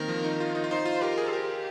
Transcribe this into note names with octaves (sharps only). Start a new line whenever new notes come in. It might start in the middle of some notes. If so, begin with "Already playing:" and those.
Already playing: D#3 A#3 C4 A#4
F3
D#4
F4
D#4
F4
D#4 C5
F4
G4 A#4
G#4
G4 A#4